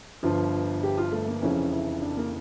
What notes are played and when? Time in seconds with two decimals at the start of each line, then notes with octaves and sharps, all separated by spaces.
0.23 G1 G2 F3 F4
0.83 G4
0.98 F4
1.12 A3
1.28 A#3
1.41 F1 F2 C#3 E3 C#4
1.72 E4
2.01 D4
2.17 A#3